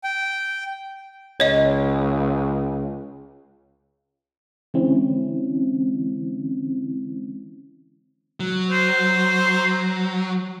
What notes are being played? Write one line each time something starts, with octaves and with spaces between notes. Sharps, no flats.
G5
C#2 C#5 D#5
D3 E3 G#3 C4 C#4 E4
F#3
C5